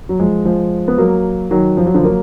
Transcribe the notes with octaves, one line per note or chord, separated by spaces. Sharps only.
F#3
F3 G#3
F3 G#3
B3
F#3 A#3
D#3 F#3
F3
F#3
D3 F3
F#3 A#3